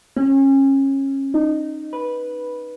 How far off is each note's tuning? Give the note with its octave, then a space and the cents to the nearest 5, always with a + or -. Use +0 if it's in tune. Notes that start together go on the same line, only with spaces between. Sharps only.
C#4 -30
D#4 -15
B4 -10